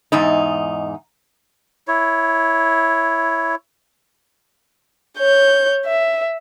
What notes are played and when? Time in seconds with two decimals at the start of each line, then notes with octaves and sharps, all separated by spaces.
0.12 E2 G#2 D#4
1.88 E4 C#5
5.18 C#5 G6
5.86 E5